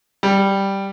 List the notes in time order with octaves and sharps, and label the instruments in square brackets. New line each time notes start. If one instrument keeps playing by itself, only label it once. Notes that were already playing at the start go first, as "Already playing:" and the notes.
[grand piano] G3